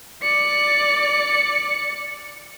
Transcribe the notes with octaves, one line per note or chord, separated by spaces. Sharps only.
D5 C#7